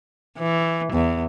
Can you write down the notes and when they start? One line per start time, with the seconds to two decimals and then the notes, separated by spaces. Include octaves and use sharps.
0.39 E3
0.93 E2